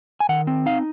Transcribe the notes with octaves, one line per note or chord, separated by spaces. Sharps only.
G#5
D#3 F#5
C4
D#4 F5